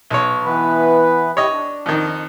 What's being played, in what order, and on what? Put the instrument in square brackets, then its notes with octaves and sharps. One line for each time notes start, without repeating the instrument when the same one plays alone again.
[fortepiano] B1 C#5
[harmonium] E3 B3 B4
[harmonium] E4 G4 [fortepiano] C#5 D#5
[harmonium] D4
[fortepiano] F2 D#3